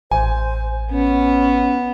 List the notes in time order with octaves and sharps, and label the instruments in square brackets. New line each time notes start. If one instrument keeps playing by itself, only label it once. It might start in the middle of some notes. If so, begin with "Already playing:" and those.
[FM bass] A1 [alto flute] C5 [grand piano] G#5
[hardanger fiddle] B3 [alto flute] C#4